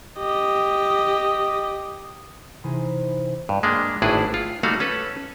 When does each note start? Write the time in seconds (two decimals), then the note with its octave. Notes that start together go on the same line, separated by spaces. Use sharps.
0.19 G4 D#5
2.64 C3 E3 D#4 E4 G#4
3.49 G2
3.63 G#3 A#3 D4
4.02 G#1 A2 D4 E4 G#4 B4
4.34 F4
4.63 G3 A3 A#3 D#4 F#4 F5
4.80 C#4 A4 B4